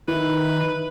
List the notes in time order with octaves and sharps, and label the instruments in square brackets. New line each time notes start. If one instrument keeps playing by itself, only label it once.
[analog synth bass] D#3 [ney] D#4 [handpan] E4 [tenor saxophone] B4